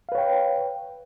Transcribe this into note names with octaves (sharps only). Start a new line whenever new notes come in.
B4 C#5 F5 G5